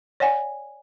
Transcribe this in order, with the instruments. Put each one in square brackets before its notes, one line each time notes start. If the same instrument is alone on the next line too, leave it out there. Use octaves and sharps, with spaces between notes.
[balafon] C#5 D5 F#5 G#5